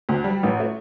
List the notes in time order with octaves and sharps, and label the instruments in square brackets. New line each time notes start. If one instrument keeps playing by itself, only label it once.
[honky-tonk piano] D2
G3
A1
A3